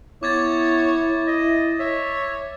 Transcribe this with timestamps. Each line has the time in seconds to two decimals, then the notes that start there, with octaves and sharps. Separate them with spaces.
0.23 B3 E4 C#5 D6 G#6 A6
1.27 D#5
1.80 C#5 E5